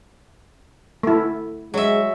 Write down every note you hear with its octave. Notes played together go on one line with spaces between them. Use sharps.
A3 E4
F#3 G#3 E5